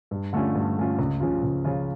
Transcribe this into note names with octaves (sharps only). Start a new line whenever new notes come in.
G2
D3 A3 C#4 F4
G2
D3 A3 C#4 F4
C#2
C#3 F3 C#4 F4
C#2
C#3 F3 C#4 F4